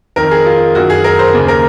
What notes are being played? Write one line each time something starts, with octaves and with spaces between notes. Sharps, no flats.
F2 D#3 A#4
G#4
F4
F#2 D#3 F#4
G#4
A#4
C5
D#2 C#3
A#4